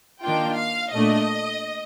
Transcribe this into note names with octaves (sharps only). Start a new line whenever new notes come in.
D#3 A#3 D4 F4 G5
F5
A#2 A3 D4 D#5